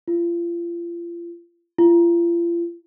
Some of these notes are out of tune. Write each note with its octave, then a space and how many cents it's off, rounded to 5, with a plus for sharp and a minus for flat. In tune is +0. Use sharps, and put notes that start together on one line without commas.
F4 -35
F4 -40